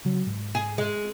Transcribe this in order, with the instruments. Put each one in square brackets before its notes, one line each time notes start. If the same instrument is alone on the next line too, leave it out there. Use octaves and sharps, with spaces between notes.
[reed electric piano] C#3 F#3
G#2
[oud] G#4
G#3